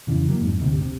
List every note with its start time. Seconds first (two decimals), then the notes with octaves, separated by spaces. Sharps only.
0.07 F2 C#3 E3
0.28 F#3 A#3
0.41 F2 G#2
0.60 G1 D2 C3
0.81 C3